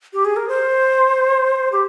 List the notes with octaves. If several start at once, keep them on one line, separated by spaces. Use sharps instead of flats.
G4
G#4
A#4
C5
G4